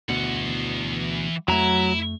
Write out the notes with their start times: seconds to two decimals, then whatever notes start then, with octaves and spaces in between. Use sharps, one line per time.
0.09 D2 B2 E3 F#5
1.48 F2 F#3 A3 E4 A#5